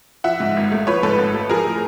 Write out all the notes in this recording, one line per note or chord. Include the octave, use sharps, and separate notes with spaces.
F3 E5 F#5
G#2
G#1
A3
F3 B4 C#5
G#2 A4 B4
G#1
A3
F3 G#4 A#4
A2